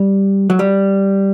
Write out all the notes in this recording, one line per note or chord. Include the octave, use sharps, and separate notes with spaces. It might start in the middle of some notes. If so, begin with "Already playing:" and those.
Already playing: G3
F#3
G3